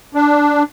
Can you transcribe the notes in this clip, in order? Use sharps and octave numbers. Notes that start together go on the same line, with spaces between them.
D4